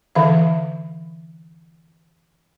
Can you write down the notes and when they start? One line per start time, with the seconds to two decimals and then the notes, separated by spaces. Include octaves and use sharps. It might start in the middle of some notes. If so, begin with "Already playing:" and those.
0.15 D3 E3 E5 F5